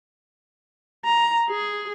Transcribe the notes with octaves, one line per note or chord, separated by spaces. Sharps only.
A#5
G#4